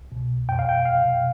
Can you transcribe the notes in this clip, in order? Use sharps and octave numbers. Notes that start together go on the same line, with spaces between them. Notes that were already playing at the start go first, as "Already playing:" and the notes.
Already playing: C2
B2
F2 G5
F5
G5
C3 F5